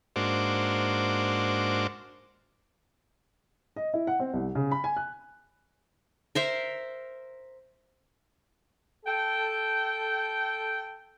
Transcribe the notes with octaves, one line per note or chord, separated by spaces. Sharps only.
G#2 A#3 D4 F#4 C5 D6
D#5
E4
F#5
C4
C2
C#3
B5
G#5
F#6
A#4 C5 E5
A4 G5